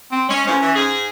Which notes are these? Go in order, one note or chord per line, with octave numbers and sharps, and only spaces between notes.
C4
G#3 C#4
E2 A2 F3 C#4
E3
G#2 G#4